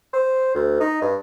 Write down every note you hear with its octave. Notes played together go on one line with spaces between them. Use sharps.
C5
D2
D#4
G2